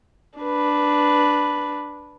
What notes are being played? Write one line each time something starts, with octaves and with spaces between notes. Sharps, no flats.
D4 B4